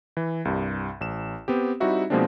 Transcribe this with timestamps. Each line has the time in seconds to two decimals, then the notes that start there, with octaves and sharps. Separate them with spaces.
0.17 E3
0.45 C2 G2
1.01 A1 E7
1.48 B3 C4 G4
1.80 G3 C4 D#4 E4 F#4 E5
2.10 B2 F3 G#3 A#3 C4 D4